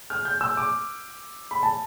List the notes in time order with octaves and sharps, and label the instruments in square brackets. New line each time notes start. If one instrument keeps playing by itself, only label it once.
[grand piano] F6
G6
E6
D6
B5
A5